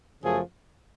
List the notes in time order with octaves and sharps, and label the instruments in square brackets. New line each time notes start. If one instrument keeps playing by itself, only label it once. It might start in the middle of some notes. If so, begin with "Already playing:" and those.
[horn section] F#2 C#3 F3 A3 G#4